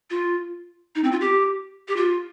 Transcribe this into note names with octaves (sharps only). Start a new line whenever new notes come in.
F4
D#4
C4
F4
G4
G4
F4